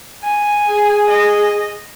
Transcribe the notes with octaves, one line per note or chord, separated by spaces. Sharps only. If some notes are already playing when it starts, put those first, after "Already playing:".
G#5
G#4
D#5